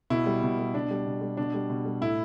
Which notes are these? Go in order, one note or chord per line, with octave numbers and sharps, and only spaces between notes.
B2 E4
G3
B2
G3
B2 D4
G3
B2
G3
B2 D4
G3
B2
G3
A2 E4